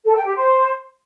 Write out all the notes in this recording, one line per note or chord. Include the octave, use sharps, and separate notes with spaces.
A4
G5
G4
C5